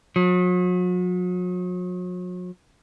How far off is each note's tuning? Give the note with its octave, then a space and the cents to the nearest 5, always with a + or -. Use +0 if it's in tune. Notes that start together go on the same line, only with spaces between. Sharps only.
F#3 -40